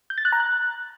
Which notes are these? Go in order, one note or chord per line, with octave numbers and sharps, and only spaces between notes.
G6
A6
F#6
A#5
F#6